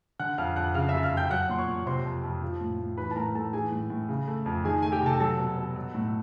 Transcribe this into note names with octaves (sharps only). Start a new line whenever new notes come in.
D3 F#5 F#6
F2 F5 F6
F2 F#5 F#6
C#3 F5 F6
F#2 E5 E6
F5 F6
F#2
G5 G6
F#3 F#5 F#6
A#2 C6
C#5 C#6
A#2
C3 C5 C6
F2
F2
F3
A2
A2
E3 B4 B5
A5
A2 A#4 A#5
A2 A4 A5
E3 G#4 G#5
A2
A2
C#3
A3
F2
D#3 G#4 G#5
A3 G#5
G4 G5
C3 A4 A5
F#3 A4 A5
B2
B2
F#3
A2